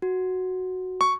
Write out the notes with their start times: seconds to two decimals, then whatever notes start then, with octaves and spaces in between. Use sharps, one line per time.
0.02 F#4
1.01 C#6